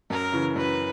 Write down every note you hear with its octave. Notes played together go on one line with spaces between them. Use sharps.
F#2 A#4
C#3 E3
F#2 B4